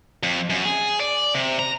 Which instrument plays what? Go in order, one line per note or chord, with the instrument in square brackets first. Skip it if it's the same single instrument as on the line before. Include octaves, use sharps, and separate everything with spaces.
[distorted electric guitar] F2
F#2
G#4
D5
C3
A#5